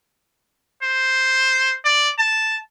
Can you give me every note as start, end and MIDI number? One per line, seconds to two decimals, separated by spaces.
0.83 1.75 72
1.85 2.10 74
2.19 2.57 81